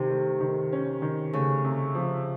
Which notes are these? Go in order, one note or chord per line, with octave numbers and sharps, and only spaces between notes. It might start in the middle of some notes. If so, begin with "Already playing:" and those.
Already playing: C3 D#3
A3
D#3
C#4
D#3
C#3 A3
C3
F3